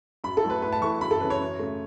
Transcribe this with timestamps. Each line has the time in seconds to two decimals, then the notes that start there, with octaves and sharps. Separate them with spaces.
0.24 F#2 B5
0.37 A4
0.43 F#3 A3 E4
0.50 B4
0.62 A2 B4
0.73 A5
0.81 E3 A3 E4 C#6
1.01 F#2 B5
1.11 A4
1.20 C#3 E3 C#4 B4
1.30 C#5
1.40 F#2
1.59 C#3 A3